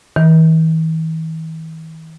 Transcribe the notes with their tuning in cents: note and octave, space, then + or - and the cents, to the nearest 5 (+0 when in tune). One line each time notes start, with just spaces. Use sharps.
E3 -45